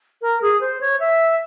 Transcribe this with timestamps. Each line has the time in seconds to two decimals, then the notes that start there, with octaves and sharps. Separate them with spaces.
0.22 A#4
0.42 G#4
0.61 C5
0.81 C#5
1.00 E5